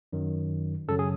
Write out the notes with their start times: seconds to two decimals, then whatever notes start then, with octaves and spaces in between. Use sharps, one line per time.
0.13 F#2 D#3 F#3
0.89 F#2 C#3 F#3 A4
0.99 G#4